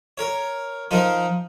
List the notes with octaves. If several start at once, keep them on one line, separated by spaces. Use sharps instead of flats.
A#4 C#5
F3 D#4 A#4 C5